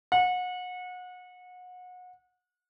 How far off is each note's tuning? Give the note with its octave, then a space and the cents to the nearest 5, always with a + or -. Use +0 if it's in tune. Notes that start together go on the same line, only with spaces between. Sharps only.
F#5 -30